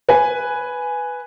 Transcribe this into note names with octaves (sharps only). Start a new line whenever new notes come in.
B4 G#5